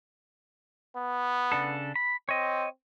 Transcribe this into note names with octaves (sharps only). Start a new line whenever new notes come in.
B3
C#3 D4 A4
B5
C4 C#5 D#5